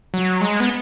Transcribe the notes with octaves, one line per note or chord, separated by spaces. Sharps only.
F#3
G#3
B3